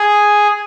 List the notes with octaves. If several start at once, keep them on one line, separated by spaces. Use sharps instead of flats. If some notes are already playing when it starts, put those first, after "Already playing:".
Already playing: G#4